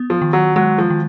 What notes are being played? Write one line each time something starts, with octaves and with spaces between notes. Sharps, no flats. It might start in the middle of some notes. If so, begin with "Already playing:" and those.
Already playing: B3
F3
D#3
F#3
F#3 G#3
F3
D#3